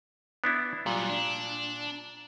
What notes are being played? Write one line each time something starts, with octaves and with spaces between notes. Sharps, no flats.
B3 D4 E4
A#2 F#3 G3
D4